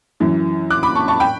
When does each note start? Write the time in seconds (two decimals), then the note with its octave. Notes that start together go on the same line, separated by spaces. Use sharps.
0.20 F#2 E3
0.70 D6 F#6
0.83 B5 D6
0.95 A5 C#6
1.08 A5 C#6
1.20 G5 B5